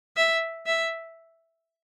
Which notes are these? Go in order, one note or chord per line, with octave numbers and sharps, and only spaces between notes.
E5
E5